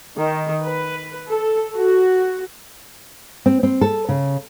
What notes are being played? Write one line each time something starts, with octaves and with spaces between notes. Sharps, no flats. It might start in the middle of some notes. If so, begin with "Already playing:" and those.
D#3
B4
A4
F#4
C4
C4
A4
C#3